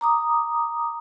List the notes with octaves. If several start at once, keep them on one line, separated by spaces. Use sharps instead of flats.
A#5 D6 D#6